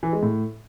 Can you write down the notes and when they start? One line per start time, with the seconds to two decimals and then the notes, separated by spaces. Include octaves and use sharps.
0.03 E3
0.13 G#3
0.23 A2